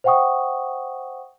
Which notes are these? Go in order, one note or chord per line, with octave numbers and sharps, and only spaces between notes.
C5 E5 F#5 G5 C#6 D#6